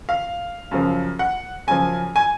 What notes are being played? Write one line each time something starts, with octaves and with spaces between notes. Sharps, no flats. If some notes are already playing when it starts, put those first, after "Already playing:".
F5
F#2 C#3 F3
F#5
F#2 C#3 F3 G#5
G#5